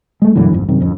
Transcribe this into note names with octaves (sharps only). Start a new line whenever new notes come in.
G#3 A3
F#2 B2 D3 E3
G1 F2 G#2
F#2 C3 D#3
D1 F2 C#4